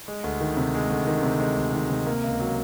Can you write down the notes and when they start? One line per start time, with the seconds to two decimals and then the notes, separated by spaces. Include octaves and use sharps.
0.08 G#3
0.24 D2
0.41 D#3
0.57 C3
0.74 G#3
0.90 D2
1.07 D#3
1.23 C3
1.40 G#3
1.56 D2
1.73 D#3
1.90 C3
2.07 A#3
2.24 C#2
2.40 F#3